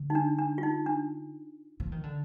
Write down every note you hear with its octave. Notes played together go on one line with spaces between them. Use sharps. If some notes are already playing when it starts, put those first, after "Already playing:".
Already playing: D3
D#4
D4
D4
F4
D#4
D4
F3
D#3
D3